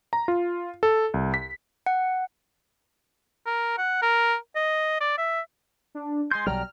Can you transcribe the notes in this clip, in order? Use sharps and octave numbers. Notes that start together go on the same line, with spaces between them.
A#5
F4
A4
C2
B6
F#5
A#4
F#5
A#4
D#5
D5
E5
D4
G#3 G#4 C6 G6
B1 F#3 G3 D5 G5 A#5 F6